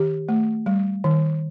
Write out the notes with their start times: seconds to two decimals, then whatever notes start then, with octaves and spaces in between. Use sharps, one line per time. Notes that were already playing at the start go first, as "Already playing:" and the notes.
Already playing: D#3 G4
0.29 A3
0.66 G3
1.04 D#3